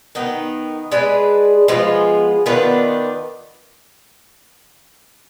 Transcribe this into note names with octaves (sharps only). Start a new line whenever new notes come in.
D#3 B3 D#4
G#3 D4 G#4 B4
F3 G#3 B3 F4
D#3 B3 D4 F4